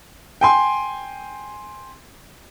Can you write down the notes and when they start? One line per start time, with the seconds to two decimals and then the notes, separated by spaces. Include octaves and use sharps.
0.41 G5 G#5 C6